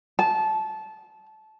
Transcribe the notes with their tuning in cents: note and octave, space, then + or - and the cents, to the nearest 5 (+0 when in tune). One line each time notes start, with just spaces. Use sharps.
A5 -20